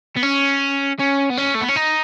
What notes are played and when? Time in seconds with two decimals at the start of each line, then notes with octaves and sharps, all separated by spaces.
0.16 B3
0.23 C#4
1.00 C#4
1.30 B3
1.38 C#4
1.55 A3
1.62 B3
1.69 C#4
1.77 D#4